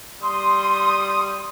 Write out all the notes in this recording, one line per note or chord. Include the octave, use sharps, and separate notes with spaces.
G3 C6 D#6